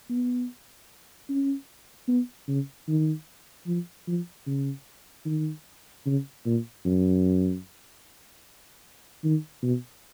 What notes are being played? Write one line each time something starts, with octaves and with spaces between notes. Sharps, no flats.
B3
C#4
B3
C#3
D#3
F3
F3
C#3
D#3
C#3
A#2
F#2
D#3
B2